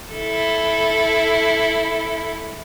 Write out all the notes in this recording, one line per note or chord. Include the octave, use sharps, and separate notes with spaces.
E4 A4